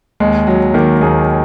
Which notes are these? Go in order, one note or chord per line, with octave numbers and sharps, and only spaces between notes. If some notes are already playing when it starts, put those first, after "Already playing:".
D#2 G#3
F#3
D#3 A#3
D#2 G#4